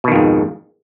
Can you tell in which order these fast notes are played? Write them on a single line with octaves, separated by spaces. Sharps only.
B2 D#3 F2 G#2